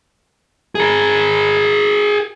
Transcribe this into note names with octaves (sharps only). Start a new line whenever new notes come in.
G#4 A#4